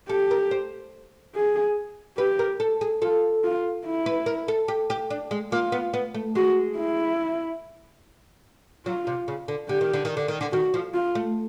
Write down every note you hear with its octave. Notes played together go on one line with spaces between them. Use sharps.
G4 A4
A#4
C5
G#4
G4 B4
A#4
A4
G#4
F4 A4
F4
E4
B4
A#4
A4
G4
G4
D4
G#3
A#3 F4
B3
B3
A3
G#3 F#4
E4
F#3 F4
C3
C#3
D3
D3 G4
D#3
D3
D#3
D3
D#3
D3
D#3 F#4
F3
F4
A3